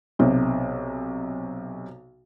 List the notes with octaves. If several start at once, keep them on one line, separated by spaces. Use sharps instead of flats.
B1 C3